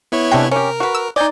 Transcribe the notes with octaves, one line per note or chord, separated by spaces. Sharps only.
B3 E4 C#5
C3 G#3 A3 D4 G5
C#4 G4 A#4
F#4 B4
E6
D#4 D5 D#5 G#5 G6